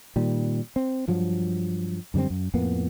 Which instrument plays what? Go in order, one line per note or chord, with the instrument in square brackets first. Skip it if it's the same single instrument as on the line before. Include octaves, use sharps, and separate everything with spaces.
[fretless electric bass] A#2 D#3 G3
C4
G2 F3 F#3
F#2 D3 G3 C4
F#2
F2 A2 A#3 B3